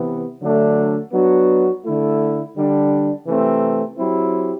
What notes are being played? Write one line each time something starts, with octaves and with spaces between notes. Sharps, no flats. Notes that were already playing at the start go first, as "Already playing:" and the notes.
Already playing: C3 E3 B3
D3 F#3 A3 D4
F#3 B3 D4 F#4
D3 A3 E4
D3 G3 D4
C3 E3 A3 C4
F#3 C4 E4 G4